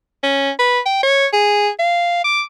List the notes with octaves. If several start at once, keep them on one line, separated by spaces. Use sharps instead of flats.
C#4
B4
G5
C#5
G#4
F5
D6